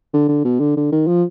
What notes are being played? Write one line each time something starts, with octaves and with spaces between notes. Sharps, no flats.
D3
D3
B2
D3
D3
D#3
F3